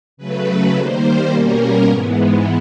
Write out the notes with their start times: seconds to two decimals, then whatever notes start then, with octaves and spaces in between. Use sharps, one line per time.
0.17 C#3 F#3 A3 B4
0.74 D#3 G3 A#3 C5
1.03 C5
1.31 B2 G3 A#3 C#4 A#4
1.87 G#2 E3 G#3 B3